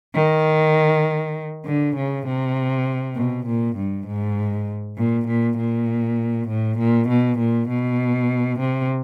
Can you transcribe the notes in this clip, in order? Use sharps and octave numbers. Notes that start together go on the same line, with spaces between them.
D#3
D3
C#3
C3
B2
A#2
G2
G#2
A#2
A#2
A#2
A2
A#2
B2
A#2
B2
C3